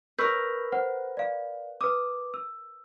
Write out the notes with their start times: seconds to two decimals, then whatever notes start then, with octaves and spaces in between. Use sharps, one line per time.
0.19 A#4 B4 C#6 E6 G6
0.72 C5 F#5
1.17 D5 F5
1.81 B4 D6 D#6
2.34 E6